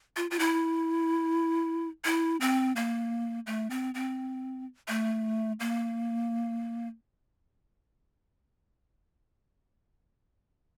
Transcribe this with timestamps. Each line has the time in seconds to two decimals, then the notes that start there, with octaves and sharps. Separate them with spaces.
0.17 F4
0.31 F4
0.39 E4
2.05 E4
2.41 C4
2.76 A#3
3.47 A3
3.70 C4
3.94 C4
4.88 A3
5.60 A#3